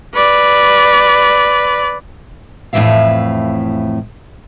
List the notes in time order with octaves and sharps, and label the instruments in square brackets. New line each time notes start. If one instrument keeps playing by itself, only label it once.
[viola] B4 D5
[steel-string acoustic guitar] F2 A2 C3 E3 E5 F5